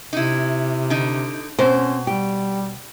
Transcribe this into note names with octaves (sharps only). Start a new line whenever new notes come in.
C3 D#4 E4
D3 D#4
B2 C4 C#4 C5
G3 G4